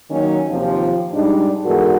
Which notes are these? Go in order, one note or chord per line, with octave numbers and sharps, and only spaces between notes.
D#3 F#3 A#3 C#4 D#4
D#2 C3 F3
G#2 G3 D4 D#4
E2 G#2 F#4 A4 A#4